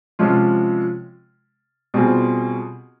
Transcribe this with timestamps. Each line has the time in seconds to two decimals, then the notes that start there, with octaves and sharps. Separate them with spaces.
0.19 C3 F3 G#3 C#4 F4
1.94 B2 G3 C4 F4 G#4